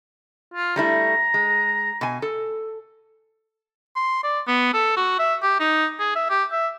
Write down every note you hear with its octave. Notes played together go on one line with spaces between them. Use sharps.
F4
G3 A3 E4 A#5
G#3
B2 G#5
A4
C6
D5
B3
A4
F#4
E5
G4
D#4
G#4
E5
G4
E5